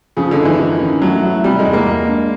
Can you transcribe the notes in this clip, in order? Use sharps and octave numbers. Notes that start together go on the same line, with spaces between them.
C#3 F3
D3
D#4
E3
D#3
C#4
F#3 A3
E4
C3 G3
G#3
E2
A#3
G#3
D4